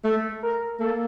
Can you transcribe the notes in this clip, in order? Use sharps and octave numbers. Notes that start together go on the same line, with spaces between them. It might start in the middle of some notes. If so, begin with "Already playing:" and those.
A3 A4
A#4
A#3 A4